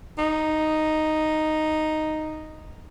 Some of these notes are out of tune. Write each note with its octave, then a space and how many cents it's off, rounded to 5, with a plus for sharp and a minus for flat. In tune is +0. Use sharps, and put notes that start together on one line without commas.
D#4 -5